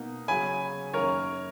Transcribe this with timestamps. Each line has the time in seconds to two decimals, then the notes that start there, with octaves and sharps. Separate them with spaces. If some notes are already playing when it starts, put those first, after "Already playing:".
Already playing: B2 A#3 D#4
0.28 C#3 F#3 C#4 G#5 B5
0.94 F#2 D#3 A#3 A#4 C#5